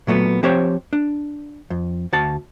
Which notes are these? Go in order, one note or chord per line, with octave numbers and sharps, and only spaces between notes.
A#2 F#3 A3 B3
F3 C4 G4 C5 C#5
D4
F2
D2 F#4 A5